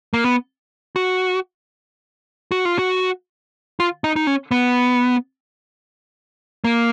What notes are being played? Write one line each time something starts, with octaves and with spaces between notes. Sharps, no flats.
A#3
B3
F#4
F#4
F4
F#4
F4
D#4
D#4
C#4
B3
A#3